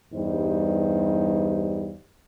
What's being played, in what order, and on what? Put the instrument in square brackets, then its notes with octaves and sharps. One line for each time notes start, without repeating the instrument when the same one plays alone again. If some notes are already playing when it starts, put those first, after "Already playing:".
[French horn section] E2 G2 G3 D#4 C5